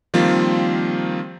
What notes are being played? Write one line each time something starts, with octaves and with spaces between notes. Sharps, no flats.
D#3 F3 G3 A#3 C4 F4